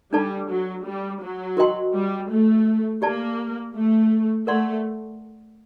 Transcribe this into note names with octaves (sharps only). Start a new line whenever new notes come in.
G3 D4 A4 D5 A5
F#3
G3
F#3
F#4 A#4 D#5 G5 C6
G3
A3
A#3 G4 D5 A5
A3
A3 A#4 D5 F#5 C6